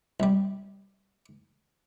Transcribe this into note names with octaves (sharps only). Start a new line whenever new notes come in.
C2 G3